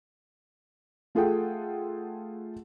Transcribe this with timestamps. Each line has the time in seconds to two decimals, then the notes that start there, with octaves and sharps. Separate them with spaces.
1.15 A3 F4 G#4 A4 F#5 G5